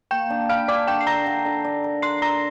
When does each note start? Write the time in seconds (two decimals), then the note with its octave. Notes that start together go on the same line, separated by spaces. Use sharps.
0.11 A#3 G5 G6
0.30 D4
0.49 D4 F5 F6
0.68 D4 D5 D6
0.87 D3 G5 G6
1.01 C7
1.07 D3 A#5 A#6
1.26 D3
1.45 D3
1.64 D5
1.84 A#4
2.02 A#4 C6 C7
2.22 D5 A#5 A#6